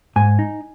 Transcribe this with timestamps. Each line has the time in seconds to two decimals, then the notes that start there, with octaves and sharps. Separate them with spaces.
0.16 G#2 G#5
0.39 D#4